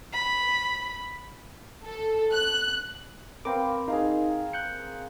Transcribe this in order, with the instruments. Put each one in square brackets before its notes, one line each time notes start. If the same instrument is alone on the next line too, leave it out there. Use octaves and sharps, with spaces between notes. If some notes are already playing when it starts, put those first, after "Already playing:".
[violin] B5
[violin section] A4
F#6
[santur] C4 A#4 B4 [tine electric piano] F5 G5 D6
[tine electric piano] D#4 [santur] G#4 A#4 F5
[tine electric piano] F#6 G6 C#7